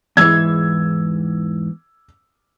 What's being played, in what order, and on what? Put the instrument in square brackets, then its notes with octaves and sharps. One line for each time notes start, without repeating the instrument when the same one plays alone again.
[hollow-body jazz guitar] E2 G#2 E3 [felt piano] E6 G#6